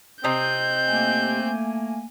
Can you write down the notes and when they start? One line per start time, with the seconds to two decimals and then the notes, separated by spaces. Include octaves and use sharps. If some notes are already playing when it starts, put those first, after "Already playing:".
0.24 C3 C4 D#5 G6
0.88 A3 A#3 G#5